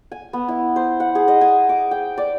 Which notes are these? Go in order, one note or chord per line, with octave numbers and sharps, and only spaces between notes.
G#5
B3
E4
C5
F#5
G#4
D#5
G#5
D6
G5
D5